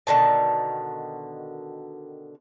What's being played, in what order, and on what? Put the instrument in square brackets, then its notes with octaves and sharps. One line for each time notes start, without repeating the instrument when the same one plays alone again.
[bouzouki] B2 D3 D#3 A5